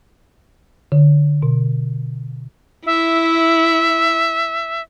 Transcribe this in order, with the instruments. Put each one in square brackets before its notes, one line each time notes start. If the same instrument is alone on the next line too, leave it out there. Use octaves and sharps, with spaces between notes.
[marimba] D3
B2
[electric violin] E4 [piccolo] E5